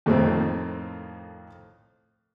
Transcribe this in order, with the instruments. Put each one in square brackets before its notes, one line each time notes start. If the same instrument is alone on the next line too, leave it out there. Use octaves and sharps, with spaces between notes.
[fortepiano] F2 A2 D#3 A3 C4